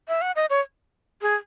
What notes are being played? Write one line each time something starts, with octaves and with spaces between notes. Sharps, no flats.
E5
F#5
D#5
C#5
G#4